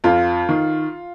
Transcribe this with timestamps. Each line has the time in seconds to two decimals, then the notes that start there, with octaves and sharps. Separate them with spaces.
0.04 F2 F4
0.49 D#3